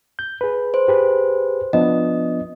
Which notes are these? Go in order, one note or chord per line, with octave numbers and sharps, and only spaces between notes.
G6
G#4 B4
C5
G4 G#4 B4
F3 B3 D4 D#5